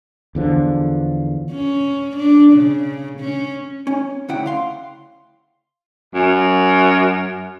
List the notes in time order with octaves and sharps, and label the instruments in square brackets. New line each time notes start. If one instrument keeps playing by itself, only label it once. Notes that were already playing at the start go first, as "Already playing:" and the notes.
[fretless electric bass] E2 D3 F3
[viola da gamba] C#4
D4
C#3
C#4
[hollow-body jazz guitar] C#4
D2 C#3 E4 F#5 G5
F5 C6
[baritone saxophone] F#2